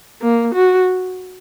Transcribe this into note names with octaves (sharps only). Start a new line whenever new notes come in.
A#3
F#4